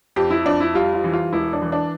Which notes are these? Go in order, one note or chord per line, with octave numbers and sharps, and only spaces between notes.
F2 G4
E4
F2 D4
E4
G3 F4
F4
E3
F4
E1 E4
D4
E3
D4